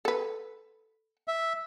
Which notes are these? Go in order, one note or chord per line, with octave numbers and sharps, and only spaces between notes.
A4 B4
E5